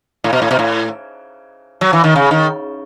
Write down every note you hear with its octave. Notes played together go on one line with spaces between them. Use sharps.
A2
B2
A2
B2
A2
F#3
E3
D#3
C#3
D#3